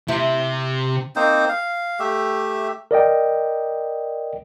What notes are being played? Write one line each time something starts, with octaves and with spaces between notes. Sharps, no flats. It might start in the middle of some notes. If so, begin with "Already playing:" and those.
C3 E4
A#3 C4 D#4 C5
F5
A3 G4 E5
A#4 D5 D#5 G5